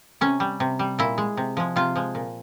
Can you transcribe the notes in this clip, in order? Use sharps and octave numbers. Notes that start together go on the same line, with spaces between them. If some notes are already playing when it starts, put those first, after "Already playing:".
C3 C#4
G3
C3
G3
A#2 E4
G#3
C3
F3 G#3
C3 F4
F3 G#3
A#2